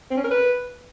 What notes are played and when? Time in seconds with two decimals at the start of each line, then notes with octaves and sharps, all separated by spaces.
0.11 C4
0.17 C#4
0.24 A#4
0.31 B4